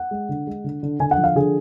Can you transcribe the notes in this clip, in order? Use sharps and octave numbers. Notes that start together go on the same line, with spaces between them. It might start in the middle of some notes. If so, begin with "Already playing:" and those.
Already playing: F#5
G#3
D3
G#3
D3
D3
D3 G#5
F#5
F3
F5
D3 G#4